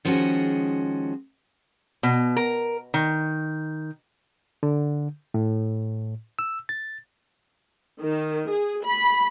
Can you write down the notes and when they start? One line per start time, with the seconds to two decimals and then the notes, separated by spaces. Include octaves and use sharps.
0.05 D#3 F3 G#3 C#4 F#4 G#4
2.03 B2
2.37 A#4
2.94 D#3
4.63 D3
5.34 A2
6.39 E6
6.69 A6
8.01 D#3
8.50 G#4
8.84 B5